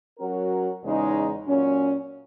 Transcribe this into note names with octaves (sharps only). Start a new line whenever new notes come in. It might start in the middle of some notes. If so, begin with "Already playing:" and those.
F#3 C#4 F#4 A#4
E2 C#3 G#3 D#4
A#2 F#3 C#4